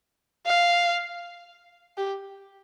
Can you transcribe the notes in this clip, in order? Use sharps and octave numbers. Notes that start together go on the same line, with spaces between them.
F5
G4